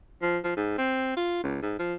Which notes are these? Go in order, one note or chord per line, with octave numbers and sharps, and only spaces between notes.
F3
F3
G#2
C4
F4
C#2
G#2
F3